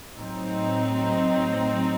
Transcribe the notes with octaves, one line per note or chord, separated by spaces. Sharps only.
A2 F#3 C4 D#4